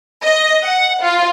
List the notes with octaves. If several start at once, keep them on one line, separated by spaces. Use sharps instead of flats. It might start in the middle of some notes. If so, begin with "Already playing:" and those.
D#5
F#5
F4